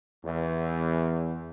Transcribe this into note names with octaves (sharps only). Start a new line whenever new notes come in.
E2